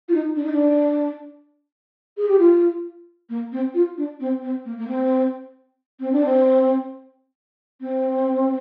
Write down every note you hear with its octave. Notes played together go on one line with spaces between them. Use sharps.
F4
D#4
D4
D#4
D4
G#4
G4
F4
A#3
C4
F4
D4
C4
C4
A#3
A#3
C4
C4
D4
C4
C4